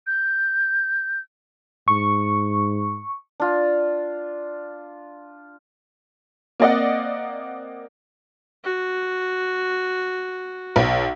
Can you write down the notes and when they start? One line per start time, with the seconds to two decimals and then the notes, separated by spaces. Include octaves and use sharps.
0.07 G6
1.88 G#2 C#6
3.40 D4 F4
6.60 A#3 C4 D5 D#5 F#5
8.64 F#4
10.76 B1